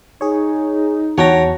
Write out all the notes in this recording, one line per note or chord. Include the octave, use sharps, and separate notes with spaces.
D#4 G#4 C#5
E2 F#4 C#5 F#5 G5 A5 A#5